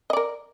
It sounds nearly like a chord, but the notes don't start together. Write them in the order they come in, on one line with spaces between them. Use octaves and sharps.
D#5 D5 A#4